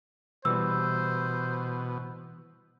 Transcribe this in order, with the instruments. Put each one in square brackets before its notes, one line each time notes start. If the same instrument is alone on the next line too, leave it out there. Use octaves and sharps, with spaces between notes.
[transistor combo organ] B2 [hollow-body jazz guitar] E3 G3 B4 [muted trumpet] C5 [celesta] E6